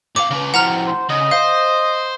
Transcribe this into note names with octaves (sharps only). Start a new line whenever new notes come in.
A2 F5 D6
C#3 B4
A2 F3 F#5 A#5 F6
C5
C#3 D#5
C5 F5